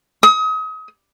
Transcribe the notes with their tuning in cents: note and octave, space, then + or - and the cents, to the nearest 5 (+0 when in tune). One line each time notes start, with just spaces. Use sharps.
D#6 +35